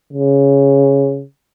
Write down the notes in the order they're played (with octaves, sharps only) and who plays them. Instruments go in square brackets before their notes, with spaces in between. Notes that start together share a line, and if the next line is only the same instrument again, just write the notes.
[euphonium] C#3